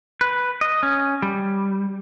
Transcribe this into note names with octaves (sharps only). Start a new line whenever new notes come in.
B4
D#5
C#4
G3